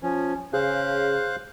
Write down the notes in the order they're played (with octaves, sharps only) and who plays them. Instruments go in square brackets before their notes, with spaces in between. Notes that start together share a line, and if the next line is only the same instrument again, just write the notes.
[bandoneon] F3 C#4
[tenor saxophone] C#3 [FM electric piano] G#4 [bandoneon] C5 F5 F#6